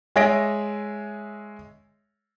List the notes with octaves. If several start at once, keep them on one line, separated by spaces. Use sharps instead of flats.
G#3 G#4 C#5 E5 A#6 D7